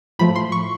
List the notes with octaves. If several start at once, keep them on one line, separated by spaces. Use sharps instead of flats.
A2 F3 A3 B5
C6
C#6